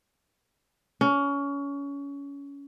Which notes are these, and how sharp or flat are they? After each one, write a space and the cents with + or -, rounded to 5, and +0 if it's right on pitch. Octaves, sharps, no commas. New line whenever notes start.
C#4 +25